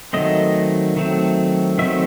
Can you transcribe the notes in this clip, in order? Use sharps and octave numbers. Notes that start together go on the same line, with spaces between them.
D#3 F#3 A3 C4 D#5
D#3 F#3 A3 C4
D#3 F#3 A3 C4 E5